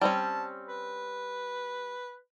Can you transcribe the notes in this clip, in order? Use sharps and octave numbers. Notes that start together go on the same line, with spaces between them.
G3 C4 C#4 A5
B4